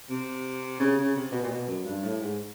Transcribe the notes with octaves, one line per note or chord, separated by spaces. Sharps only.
C3
C#3
C#3
C3
B2
A#2
B2
F#2
G2
A2
G#2